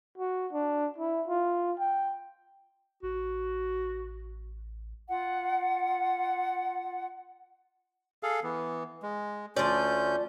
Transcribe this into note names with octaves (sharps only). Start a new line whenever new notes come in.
F#4
D4
E4
F4
G5
A1 F#4
F4 F#5
G#4 A4 F5
E3 B3
G#3
D2 F3 C#4 D5 G6